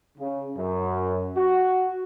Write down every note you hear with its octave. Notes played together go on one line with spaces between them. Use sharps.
C#3
F#2
F#4